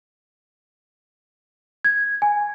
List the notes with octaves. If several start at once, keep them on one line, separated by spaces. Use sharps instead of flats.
G#6
G#5